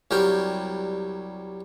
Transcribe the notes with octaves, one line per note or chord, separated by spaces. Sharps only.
C2 F#3 G3 A#4 G5